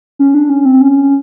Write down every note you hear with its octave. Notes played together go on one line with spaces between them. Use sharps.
C#4
D4
C#4
C4
C#4